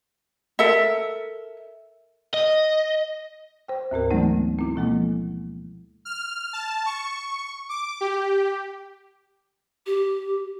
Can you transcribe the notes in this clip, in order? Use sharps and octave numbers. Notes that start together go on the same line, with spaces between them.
A4 A#4 E5
D#5
C5 G5
D2 G#2 C4 A#4
E3 F#3 G#3 A3 B3 D#4
C4 E4
B2 F3 G#3 A#3
F6
A5
C#6
D6
G4
G4